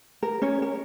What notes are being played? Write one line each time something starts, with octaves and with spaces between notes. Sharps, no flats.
A#4
C#4 C#5
A#4